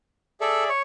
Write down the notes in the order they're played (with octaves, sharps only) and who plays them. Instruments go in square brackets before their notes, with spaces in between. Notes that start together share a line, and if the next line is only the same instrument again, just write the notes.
[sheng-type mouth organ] G#4 D5 E5 [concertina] A4
[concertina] C#5